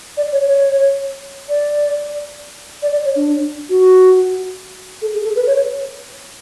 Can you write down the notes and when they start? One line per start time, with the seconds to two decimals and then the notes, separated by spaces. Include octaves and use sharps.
0.17 D5
0.32 C#5
0.47 C#5
1.49 D5
2.82 D5
2.92 D5
3.04 C#5
3.15 D4
3.69 F#4
5.02 A4
5.14 G#4
5.24 A4
5.36 B4
5.47 C#5